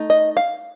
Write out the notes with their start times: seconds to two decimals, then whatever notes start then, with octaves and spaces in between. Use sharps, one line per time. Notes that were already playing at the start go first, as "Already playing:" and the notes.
Already playing: A3 D#4
0.10 D#5
0.37 F5